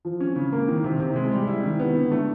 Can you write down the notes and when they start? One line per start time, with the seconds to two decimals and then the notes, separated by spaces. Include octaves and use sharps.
0.05 F3
0.20 C#4
0.36 C#3
0.52 A#3
0.68 D#3
0.84 C3
1.00 C3
1.16 G#3
1.31 G3
1.48 E4
1.64 D#3
1.79 B3
1.96 D3
2.12 A3